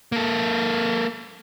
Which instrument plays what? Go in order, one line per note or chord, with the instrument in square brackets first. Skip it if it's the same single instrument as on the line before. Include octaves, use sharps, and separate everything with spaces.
[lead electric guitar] A#3 A4